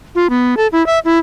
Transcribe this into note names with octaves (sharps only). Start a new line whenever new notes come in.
F4
B3
A4
E4
E5
E4